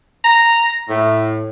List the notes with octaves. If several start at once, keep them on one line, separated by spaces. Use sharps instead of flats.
A#5
A2